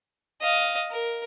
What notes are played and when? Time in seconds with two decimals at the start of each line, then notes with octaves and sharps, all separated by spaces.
0.41 D#5 F5
0.91 A#4